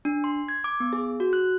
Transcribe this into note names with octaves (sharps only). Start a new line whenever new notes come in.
D4
C6
G#6
D6
B3
G#4
F#4
F#6